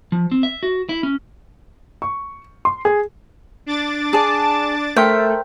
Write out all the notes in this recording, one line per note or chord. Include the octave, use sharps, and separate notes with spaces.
F3
C4
E5
F#4
E4
C#4
C#6
C6
G#4
D4 D6 A6
G#4 D5 A5
A3 A#4 C5 E5 G5